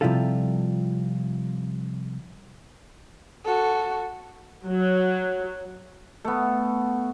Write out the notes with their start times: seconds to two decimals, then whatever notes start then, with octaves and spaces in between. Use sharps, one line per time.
0.01 C3 F3 G3 E4 F4 A4
3.45 F#4 A4
4.66 F#3
6.25 A3 B3